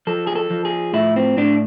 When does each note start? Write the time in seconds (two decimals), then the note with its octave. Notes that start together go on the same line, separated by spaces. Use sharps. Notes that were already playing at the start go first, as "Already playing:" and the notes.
0.07 F3 A4
0.27 G#4
0.36 A4
0.50 F3
0.65 G#4
0.93 A2 E4
1.16 C4
1.37 A2 D4